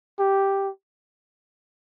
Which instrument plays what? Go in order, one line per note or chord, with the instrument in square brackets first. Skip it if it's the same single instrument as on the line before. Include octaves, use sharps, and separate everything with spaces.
[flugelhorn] G4